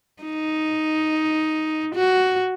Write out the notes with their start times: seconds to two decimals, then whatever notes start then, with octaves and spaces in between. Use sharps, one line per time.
0.23 D#4
1.95 F#4